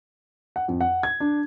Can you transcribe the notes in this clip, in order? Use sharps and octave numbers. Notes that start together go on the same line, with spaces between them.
F#5
F2
F#5
G#6
D4